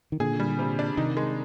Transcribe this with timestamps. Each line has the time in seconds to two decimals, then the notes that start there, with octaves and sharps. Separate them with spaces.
0.12 D#3
0.20 A#2 D3 G#4
0.40 G3
0.59 C3
0.79 D4
0.97 C3 D#3 D#4
1.17 G#3